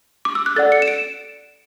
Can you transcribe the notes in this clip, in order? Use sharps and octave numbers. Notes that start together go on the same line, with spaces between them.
D6
E6
F#6
A4 D5 F#5 A6
C#7
E7
D7